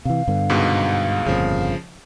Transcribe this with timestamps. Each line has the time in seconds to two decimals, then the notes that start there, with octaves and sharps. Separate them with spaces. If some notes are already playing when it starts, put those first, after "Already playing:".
0.05 C3 E3 F5
0.27 G2 D3 B3
0.49 C#2 G#2 B2
1.26 G1 F2 A#2 C#3 F3